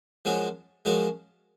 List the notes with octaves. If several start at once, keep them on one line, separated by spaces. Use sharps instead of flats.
F#2 F3 G#3 C#4 F#4
F#2 F3 G#3 C#4 F#4